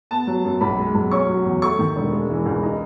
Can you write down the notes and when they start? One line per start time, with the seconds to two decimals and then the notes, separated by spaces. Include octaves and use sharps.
0.11 B3 A5
0.27 F#3
0.45 F#2
0.61 B1 B5
0.78 G#3
0.95 B1
1.11 C#4 C#6
1.29 F#3
1.45 E2
1.62 A3 C#6
1.79 D#3
1.96 E1
2.12 G#3
2.30 E3
2.46 C#2
2.63 D#4